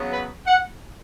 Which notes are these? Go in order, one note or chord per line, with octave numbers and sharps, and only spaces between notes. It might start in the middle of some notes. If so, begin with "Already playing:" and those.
Already playing: C#3 F#3 B3
B4
F#5